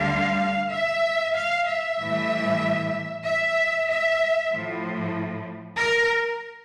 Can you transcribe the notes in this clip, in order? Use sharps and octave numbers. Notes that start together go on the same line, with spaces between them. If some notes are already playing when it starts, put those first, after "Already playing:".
Already playing: D2 D3 G3 F5
E5
F5
E5
A2 E3 G3
E5
E5
A2 F3
A#4